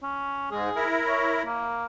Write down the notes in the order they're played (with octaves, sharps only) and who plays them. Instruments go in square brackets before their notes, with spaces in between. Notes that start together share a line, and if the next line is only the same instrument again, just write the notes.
[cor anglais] C#4
[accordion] G#2 G#3 [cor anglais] G#4
[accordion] E4 A#4
[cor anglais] C#5
A#3